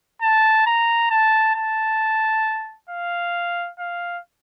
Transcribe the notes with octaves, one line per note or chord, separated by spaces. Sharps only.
A5
A#5
A5
A5
F5
F5